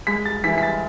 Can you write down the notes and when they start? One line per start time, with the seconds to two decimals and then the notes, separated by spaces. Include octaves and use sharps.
0.07 G#3 B6
0.26 A6
0.44 E3 B6
0.58 B6
0.63 A6